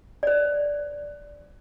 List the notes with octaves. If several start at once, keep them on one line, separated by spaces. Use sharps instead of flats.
C5 D5